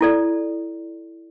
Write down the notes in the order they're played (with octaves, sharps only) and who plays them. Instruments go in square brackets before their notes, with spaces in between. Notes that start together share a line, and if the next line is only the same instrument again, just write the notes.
[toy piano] E4 A4 D5